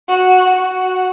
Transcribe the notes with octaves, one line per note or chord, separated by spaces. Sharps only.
F#4
F#4